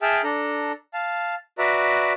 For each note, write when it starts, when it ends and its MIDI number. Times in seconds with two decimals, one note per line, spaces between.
0.02 0.22 68
0.02 0.22 76
0.02 0.22 79
0.02 0.22 81
0.02 0.22 89
0.24 0.72 62
0.24 0.72 69
0.24 0.72 82
0.94 1.35 77
0.94 1.35 81
1.58 2.13 66
1.58 2.13 71
1.58 2.13 74
1.58 2.13 76
1.58 2.13 82